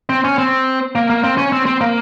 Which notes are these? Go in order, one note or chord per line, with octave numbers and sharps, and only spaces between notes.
C4
C#4
C4
A#3
A#3
C4
C#4
C4
C4
A#3